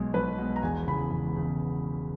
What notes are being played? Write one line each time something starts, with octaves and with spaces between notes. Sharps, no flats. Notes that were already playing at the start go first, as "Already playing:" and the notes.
Already playing: B1 B2 G#3
B1 B4
B2 G#3
A#5
E1 G#5
E2 C#3 B5
E1
C#3